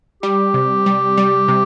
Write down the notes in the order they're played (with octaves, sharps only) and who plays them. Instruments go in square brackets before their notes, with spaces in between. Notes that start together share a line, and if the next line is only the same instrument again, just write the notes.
[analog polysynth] G3 [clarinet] G4
[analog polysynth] C3
G3
G3
C3